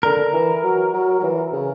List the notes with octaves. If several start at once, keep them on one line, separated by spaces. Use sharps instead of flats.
D3 A#4
E3
F#3
F#3
F#3
E3
C#3